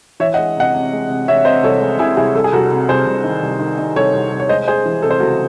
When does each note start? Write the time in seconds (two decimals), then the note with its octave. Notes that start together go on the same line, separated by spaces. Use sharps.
0.20 E3 C#5 E5
0.34 D#5 F#5
0.38 G#3
0.57 C3 D#5 F#5
0.74 C3
0.92 G#3
1.09 C3
1.28 C3 C#5 E5
1.45 C3 C5 D#5
1.63 C2 A4 C#5
1.81 G#3
1.99 C3 E4 G#4
2.17 C2 E4 G#4
2.35 C2 A4
2.44 G#4
2.52 C2 F#4 A4
2.71 C3
2.89 C2 G#4 C5
3.06 C2
3.24 D#3
3.43 C2
3.59 D#3
3.78 D#3
3.96 C2 A4 C#5
4.13 C2
4.32 C2
4.40 C#5
4.49 G#3 C5 D#5
4.67 G#3 G#4 C5
4.86 E3
5.02 C3 A4
5.11 C5
5.20 C#2 F#4 A4